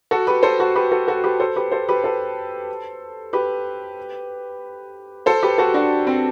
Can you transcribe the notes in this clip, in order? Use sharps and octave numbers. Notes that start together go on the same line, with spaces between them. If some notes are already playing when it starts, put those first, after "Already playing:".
F#4 A4
G4 B4
A4 C5
F#4 A4
G4 B4
F#4 A4
F#4 A4
G4 B4
A4 C5
G4 B4
A4 C5
G4 B4
A4 C5
G4 B4
A4 C5
G4 B4
F#4 A4
D4 F#4
C4